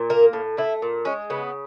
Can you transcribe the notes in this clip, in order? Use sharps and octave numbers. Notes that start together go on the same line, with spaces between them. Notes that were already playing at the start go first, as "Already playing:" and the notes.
Already playing: A#2
A#3 A#4
A2
A3 E4
A#2
G#3 C#4
C#3 B3